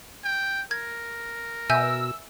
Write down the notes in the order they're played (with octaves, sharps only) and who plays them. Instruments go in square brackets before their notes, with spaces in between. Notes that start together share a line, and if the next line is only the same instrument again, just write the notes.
[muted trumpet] G5
[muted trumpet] A#4 [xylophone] G#6
[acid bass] B2 [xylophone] E5 G#5 G6 [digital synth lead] E6